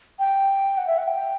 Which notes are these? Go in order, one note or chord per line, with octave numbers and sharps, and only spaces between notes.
G5
F#5
E5
F#5
G5